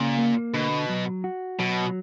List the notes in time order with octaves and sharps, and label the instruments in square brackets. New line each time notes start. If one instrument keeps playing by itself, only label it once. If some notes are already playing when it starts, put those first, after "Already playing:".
Already playing: [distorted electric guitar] A#2 [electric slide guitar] C#3
[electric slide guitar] A#3
[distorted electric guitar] B2 [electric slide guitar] D3
[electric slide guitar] F#3
F#4
[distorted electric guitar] B2 [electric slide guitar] F#3